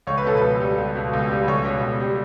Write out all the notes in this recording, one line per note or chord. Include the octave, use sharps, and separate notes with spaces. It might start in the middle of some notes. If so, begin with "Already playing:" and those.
C#2 C#5
B4
B2 A4
B4
C#2
G3
C#2
B2
C#2
G3
C#2 C#5
B2
C#2
G3